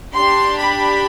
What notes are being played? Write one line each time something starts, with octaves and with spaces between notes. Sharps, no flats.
D4 G4 C6
B5